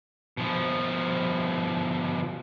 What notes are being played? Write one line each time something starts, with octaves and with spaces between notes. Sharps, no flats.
B2 F3